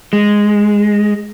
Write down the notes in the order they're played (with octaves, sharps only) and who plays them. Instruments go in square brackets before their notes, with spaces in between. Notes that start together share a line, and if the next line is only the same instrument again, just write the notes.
[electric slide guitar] G#3